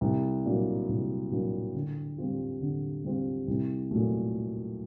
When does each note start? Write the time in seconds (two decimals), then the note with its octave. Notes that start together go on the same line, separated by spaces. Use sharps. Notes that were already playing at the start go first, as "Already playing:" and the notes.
0.01 C2
0.45 A#2 F#3 A#3 D4
0.89 C2
1.31 A#2 F#3 A#3 D4
1.75 D3
2.18 G3 C4 F4
2.61 D3
3.05 G3 C4 F4
3.48 C2
3.91 A#2 F#3 A3